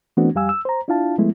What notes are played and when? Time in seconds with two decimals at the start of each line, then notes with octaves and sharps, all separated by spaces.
0.17 E3 A3 B3 C4 D4 F#4
0.35 F2 G3 G4 F5 G#5 E6
0.49 E6
0.65 C5 A#5
0.88 D4 E4 F4 F5 A5
1.18 F3 G#3 A3 B3 E4